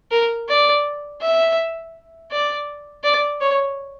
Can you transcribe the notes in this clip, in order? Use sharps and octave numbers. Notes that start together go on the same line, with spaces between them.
A#4
D5
E5
D5
D5
C#5